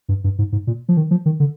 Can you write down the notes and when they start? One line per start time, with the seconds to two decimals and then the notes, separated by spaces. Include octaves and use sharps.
0.09 G2
0.24 G2
0.38 G#2
0.52 G#2
0.67 A#2
0.89 F3
0.97 D#3
1.11 F3
1.26 D#3
1.40 D3